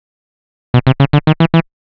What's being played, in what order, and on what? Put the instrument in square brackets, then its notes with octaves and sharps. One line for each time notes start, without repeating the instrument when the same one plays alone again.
[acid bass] B2
C3
C#3
D3
D#3
E3
E3